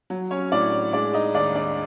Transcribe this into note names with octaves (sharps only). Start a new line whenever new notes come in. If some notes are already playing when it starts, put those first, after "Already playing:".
F#3
C#4 C#5
A2 D4 D5
G#3 D4 D5
D#4 D#5
D#2 D4 D5
D4 D5